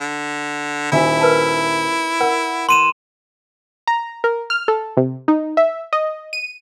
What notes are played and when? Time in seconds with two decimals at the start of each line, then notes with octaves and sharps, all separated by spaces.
0.01 D3
0.92 D#1 D#4 E4 F#4 E5 G#5
1.21 A#4 B4 A5
2.21 A#4 F#5
2.69 E3 C6 D#7 E7
3.87 A#5
4.24 A#4
4.50 F6
4.68 A4
4.97 C3
5.28 D#4
5.57 E5
5.93 D#5
6.33 D#7